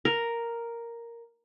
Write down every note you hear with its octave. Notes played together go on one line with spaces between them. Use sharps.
A#4